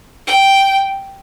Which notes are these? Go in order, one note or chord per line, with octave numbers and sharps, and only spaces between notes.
G5